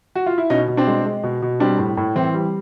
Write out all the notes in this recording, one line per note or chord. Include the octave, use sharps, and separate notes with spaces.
F#4
F4
E4
B2 C#4 D#4
B2
C4 D4
G#3
G#3
B2
B2
G3 C4 D4
A2
A2
E3 C4
G3